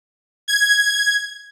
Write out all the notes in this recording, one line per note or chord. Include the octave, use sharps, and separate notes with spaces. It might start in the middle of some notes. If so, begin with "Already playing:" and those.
G#6